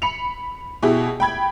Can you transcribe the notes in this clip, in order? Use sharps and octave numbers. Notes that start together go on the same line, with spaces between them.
B5 C#7 F7
B2 E4 G4 G#4
G5 B5 G#6